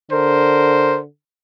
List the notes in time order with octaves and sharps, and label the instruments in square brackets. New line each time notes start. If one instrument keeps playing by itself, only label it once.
[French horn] D3 [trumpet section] A#4 C5